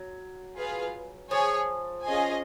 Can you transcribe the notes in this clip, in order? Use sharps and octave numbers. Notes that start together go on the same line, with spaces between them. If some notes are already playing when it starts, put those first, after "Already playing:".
Already playing: F#3
F4 G#4 B4 F5
F3 G#4 C#5 G#5
C#4 F4 G#4 D#5 G#5